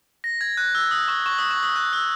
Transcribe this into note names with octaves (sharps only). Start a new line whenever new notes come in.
A#6
G#6
F#6
E6
D#6
C#6
C#6
D#6
C#6
D#6
F#6
E6